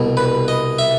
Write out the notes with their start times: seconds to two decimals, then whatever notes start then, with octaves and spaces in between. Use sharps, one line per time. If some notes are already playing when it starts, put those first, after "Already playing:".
Already playing: C2 B2
0.17 B4
0.48 D#5
0.79 E5